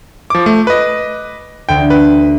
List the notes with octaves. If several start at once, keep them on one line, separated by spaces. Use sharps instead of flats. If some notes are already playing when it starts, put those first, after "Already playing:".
F3 D6
A3
B4 D#5
D2 D3 G5
B4